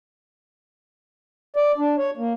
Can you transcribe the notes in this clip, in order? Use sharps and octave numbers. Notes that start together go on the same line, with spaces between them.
D5
D4
C#5
A#3